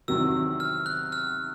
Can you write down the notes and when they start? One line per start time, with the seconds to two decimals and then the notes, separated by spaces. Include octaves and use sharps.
0.08 E2 C3 D#3 F#3 E6
0.60 F6
0.86 F#6
1.12 F6